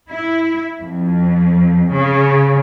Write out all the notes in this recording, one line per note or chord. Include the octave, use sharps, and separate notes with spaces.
E4
F2
C#3